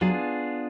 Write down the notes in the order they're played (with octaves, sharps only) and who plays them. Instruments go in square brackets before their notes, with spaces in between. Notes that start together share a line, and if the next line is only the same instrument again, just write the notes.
[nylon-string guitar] F#3 [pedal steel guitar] B3 D4 F4 G#4